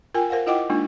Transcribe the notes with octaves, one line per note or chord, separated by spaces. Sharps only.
F4 A#4 G5 G#5
A#4 C5 F5 F#5
E4 F4 D#5 F#5 G5 D6
G#3 A#3 D4 D#4 F4